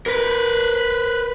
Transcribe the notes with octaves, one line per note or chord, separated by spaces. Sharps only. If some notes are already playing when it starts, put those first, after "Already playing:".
A#4 B4